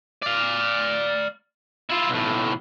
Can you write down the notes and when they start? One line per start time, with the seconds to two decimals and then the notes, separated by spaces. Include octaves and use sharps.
0.22 D5 F5
1.90 E4 F4
2.09 B1 A2